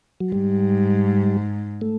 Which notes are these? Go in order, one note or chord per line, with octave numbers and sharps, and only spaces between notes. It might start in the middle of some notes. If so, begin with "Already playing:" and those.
F#3
G#2 G3
A3